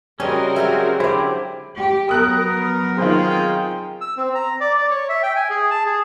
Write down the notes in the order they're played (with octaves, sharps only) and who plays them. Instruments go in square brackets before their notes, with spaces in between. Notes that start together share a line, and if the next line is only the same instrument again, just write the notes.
[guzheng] C#3 G3 [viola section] C4 F#4 A#4 [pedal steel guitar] C#4 D#5
[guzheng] F#3 G#3 G4 [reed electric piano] E5
[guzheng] D3 D5 [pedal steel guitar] E4 G4 [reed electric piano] C5
[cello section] G4
[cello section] F#3 B3 A#4 [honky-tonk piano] D#6 F#6
[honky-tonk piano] D#3 C4 [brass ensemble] F4 G#4 G5
[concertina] E6
C4
A#5
D5
D5
C#5
E5
G5
G#5
G#4
A5
G#4